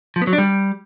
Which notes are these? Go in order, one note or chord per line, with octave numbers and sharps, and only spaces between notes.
F3
B3
F#3
D4
G3